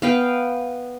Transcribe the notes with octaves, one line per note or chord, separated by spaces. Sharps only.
B3 F5 G5